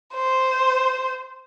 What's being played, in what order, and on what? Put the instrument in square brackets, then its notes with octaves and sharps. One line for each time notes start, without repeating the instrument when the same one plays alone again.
[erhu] C5